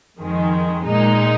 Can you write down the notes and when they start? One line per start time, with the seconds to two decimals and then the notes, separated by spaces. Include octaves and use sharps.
0.18 F2 D#3 G#3
0.85 A#2 G#3 D#4